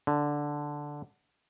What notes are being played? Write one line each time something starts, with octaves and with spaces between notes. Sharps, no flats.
D3